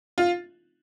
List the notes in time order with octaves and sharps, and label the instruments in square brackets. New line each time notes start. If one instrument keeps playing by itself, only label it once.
[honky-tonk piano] F4